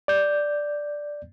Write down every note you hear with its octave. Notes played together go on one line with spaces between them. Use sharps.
D5 G6